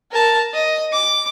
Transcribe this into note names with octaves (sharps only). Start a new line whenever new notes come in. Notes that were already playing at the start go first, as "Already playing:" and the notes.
A#4 A5
D#5
D6